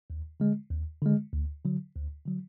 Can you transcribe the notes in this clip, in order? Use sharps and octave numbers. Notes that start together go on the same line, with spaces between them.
D#2
D3 G#3
D#2
D3 G#3
D2
D3 F#3
D2
D3 F#3